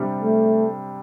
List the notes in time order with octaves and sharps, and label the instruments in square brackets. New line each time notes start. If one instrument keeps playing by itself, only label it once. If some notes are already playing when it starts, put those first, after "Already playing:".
Already playing: [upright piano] C3 G3 D4 G4
[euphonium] A3